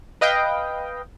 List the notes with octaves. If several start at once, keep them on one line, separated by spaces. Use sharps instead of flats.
B4 D#5 F5 G5